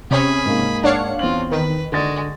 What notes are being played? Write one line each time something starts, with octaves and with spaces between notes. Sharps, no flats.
C3 C#4 G#4 B5
G#2 A#3
D4 C#5 F5 F#5
E2 C4 F4 F#7
D#3 B4
D3 G#3 F#4 D5 A6